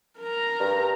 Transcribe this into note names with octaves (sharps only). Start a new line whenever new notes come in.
A#4 A#5
G2